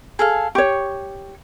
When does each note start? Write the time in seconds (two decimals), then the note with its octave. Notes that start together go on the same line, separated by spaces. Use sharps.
0.19 G#4 A4 F5
0.55 G4 C#5 C#6